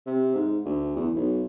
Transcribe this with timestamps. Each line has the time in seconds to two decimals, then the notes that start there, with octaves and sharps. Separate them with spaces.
0.07 C3
0.35 G#2
0.65 D2
0.96 E2
1.15 B1